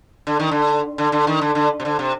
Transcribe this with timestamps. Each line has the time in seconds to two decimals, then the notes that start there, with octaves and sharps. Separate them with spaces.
0.27 D3
0.40 D#3
0.51 D3
0.98 D3
1.12 D3
1.27 D#3
1.41 D3
1.55 D3
1.80 C3
1.85 D3
1.99 C3